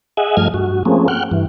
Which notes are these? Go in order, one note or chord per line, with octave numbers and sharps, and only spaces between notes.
G#4 D#5 E5 F#5 G#5
G2 F3 A3 D#5 F6 G#6
G2 F#4
F3 A3 A#3 C4 C#4 G#4
F#5 G5 F6 F#6
G2 E3